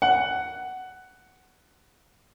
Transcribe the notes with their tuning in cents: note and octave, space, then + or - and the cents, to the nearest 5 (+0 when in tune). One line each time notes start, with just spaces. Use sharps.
F#5 +10